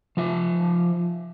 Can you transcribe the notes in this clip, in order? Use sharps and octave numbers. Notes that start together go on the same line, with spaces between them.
F3 F4 E5